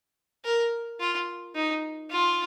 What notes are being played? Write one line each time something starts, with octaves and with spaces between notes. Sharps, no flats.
A#4
F4
D#4
F4